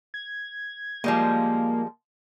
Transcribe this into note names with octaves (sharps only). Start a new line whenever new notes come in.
G#6
F3 G3 G#3 A#3